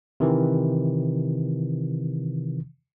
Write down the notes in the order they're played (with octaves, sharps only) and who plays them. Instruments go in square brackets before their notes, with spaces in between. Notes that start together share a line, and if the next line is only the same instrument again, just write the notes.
[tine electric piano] C3 D#3 E3